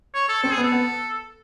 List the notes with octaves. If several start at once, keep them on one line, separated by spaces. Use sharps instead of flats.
C#5
A4
C4 A4
G#4
B3
A4
B3